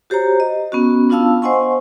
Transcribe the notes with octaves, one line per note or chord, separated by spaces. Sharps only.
F#4 G4 C5 C#5 A#5
D#5
B3 C#4 F#4
B3 D4 F4 F5 A5 E6
C5 D#5 F#5 G#5 C6 C#6